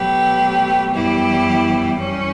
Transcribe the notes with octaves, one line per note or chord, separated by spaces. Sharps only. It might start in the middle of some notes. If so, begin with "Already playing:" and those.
Already playing: B2 F#3 A3 G4 B4
F#2 E3 G3 B3 E4 G4
F#2 E3 G3 C#4